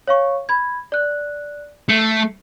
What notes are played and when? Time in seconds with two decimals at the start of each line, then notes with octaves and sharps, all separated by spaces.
0.07 C#5 F5 C#6
0.49 B5 G#6
0.92 D5 F#6
1.89 A3 C7 C#7